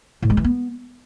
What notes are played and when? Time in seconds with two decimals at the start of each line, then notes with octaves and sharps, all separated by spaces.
0.22 A2
0.30 G#3
0.37 E3
0.44 B3